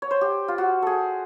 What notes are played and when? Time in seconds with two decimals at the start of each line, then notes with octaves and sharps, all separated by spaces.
0.02 C#5
0.11 C5
0.21 G4
0.48 F4
0.58 F#4
0.82 G#4 A4